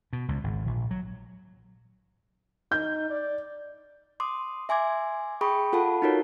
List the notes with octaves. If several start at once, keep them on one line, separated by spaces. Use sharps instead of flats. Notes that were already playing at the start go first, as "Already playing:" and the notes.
B2
C#2
G#1
A#1
F#3
D#4 G6
D5
C6 D6 D#6
E5 G#5 C6 D6 G#6
G#4 G5 B5 C#6 D#6
F4 A4 F#5 A5 B5
D#4 F4 F#4 A#4 C#5